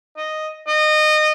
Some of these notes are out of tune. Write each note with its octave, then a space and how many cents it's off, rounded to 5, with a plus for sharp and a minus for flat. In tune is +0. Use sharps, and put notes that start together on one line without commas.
D#5 -5
D#5 -25